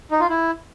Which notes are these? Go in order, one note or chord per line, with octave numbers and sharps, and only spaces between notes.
D#4
F4
E4